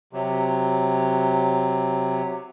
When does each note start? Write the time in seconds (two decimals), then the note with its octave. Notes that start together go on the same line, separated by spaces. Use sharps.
0.13 C3 F#3